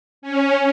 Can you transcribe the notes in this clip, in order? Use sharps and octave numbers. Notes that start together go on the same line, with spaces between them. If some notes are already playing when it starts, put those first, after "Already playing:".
C#4